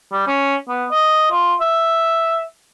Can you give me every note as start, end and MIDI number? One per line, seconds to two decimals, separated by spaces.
0.12 0.24 55
0.28 0.55 61
0.69 0.85 59
0.91 1.31 75
1.31 1.54 65
1.60 2.42 76